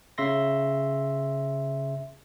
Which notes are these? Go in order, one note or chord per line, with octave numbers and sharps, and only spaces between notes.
C#3 E5 C6 A#6